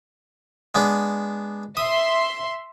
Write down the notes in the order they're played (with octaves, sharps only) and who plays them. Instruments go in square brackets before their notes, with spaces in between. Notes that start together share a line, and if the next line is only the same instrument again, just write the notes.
[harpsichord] G#3 B3 D4
[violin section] E5 C6 [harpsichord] D#6